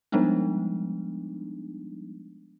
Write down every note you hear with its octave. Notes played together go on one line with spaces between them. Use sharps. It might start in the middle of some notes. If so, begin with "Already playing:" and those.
F3 G3 G#3 B3 D4 D#4